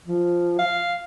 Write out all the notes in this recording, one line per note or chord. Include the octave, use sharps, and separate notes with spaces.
F3
F5